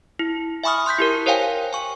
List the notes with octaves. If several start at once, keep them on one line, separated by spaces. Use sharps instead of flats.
E4
E5 G#5 B5 C#6 D#6 F6
C6 F#6 G6 B6
E4 G4 A#4
A#4 C5 C#5 F5 G5 G#5
G#5 C#6